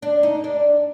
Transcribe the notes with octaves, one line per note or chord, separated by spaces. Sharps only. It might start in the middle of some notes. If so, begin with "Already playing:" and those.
D4
D#4
D4